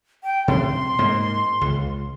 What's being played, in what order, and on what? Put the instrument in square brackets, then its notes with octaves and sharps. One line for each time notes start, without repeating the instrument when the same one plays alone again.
[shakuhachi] G5
[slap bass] C3 [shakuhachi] C6
[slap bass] G#2 A#3
C#2